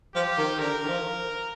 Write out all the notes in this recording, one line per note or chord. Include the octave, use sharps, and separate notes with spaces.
F3 G4
D#3
D3 A#4
D#3
F3